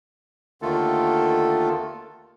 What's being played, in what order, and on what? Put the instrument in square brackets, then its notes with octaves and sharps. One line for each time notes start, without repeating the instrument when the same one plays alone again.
[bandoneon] D#2 D3 D#3 A3 F4 A4